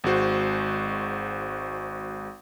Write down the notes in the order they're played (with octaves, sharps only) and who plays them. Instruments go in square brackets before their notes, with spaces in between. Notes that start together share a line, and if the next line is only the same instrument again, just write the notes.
[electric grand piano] G#1 G#3 F#4 C5